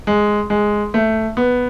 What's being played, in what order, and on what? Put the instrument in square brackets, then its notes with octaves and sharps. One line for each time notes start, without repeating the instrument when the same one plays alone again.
[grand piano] G#3
G#3
A3
B3